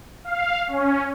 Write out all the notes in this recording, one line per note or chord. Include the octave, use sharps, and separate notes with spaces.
F5
C#4